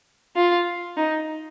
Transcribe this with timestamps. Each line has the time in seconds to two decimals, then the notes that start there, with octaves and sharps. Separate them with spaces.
0.36 F4
0.97 D#4